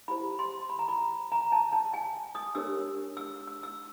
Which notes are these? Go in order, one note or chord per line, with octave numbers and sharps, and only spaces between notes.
E4 G4 C5 B5
C6
B5
A#5
B5
A#5
A5
A5
G#5
D#6
D4 G4 A#4 C#5 E6
E6
E6
E6